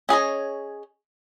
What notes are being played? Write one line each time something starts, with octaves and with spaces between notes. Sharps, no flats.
C#4 G#4 C#5 D#5